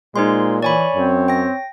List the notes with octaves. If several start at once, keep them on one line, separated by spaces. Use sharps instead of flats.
A#2 G#3 D#4 C5 C6
E3 C#5 D5 G#5 B5
F#2 C4
G5 A#6